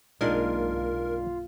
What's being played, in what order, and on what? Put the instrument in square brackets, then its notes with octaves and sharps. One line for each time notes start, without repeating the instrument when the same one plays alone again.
[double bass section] B1 G2 A#3 [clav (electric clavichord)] G#3 D4 D#4 [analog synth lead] F4 [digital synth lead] A#4